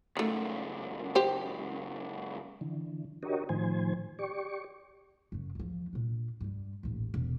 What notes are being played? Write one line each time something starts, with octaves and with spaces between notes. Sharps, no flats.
C#2 F#2 D#3 A3
G4 C5
D3 E3
D4 F#4 G4 A#4 C#5 D#5
A2 D#3 F3 C5 G#5
G4 D5 C#6
F#2 C#3
E2 F3
A#2 D4
G2 G3
D#1 A1
E1